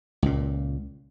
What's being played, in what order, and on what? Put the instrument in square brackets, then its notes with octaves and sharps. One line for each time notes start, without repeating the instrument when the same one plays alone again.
[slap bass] C#2 A#2